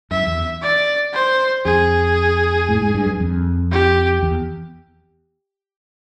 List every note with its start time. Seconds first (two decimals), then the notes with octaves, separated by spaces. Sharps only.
0.11 F#2 E5
0.27 E2
0.62 D5
1.13 C5
1.65 F2 G#4
2.69 A2
2.81 G#2
2.94 G2
3.06 F#2
3.20 F2
3.71 G4
4.23 E2